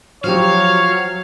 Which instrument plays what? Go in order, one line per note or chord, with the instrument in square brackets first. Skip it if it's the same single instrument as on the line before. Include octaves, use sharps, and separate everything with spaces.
[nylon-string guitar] F3 G4 [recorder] F#3 [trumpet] C#5 [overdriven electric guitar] F5